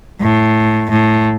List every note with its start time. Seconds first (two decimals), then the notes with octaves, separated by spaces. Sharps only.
0.21 A2
0.90 A2